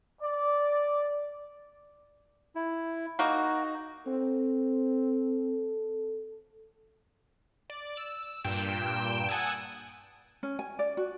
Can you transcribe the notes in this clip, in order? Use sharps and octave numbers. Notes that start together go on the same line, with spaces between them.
D5
E4
A#3 D#4 F#4
C4 A4
D5
E6
G2 A#2 G5 D7 E7
F#5 G#5 A5 D#6 E6 G#6
C#4
G#5
D5
F#4